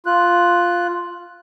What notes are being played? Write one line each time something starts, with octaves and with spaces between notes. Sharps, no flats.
F4 F#6